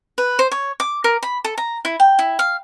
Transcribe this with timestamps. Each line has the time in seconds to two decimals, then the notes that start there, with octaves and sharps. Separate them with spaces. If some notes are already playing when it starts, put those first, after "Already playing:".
0.18 B4
0.39 C5
0.52 C#5
0.80 D6
1.04 A#4
1.23 B5
1.45 A4
1.58 A#5
1.85 E4
2.00 G5
2.19 E4
2.39 F5